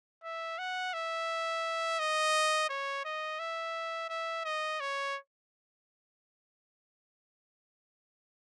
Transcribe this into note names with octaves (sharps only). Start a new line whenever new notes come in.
E5
F#5
E5
D#5
C#5
D#5
E5
E5
D#5
C#5